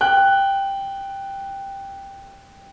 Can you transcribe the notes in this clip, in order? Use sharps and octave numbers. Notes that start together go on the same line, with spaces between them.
G5 F#6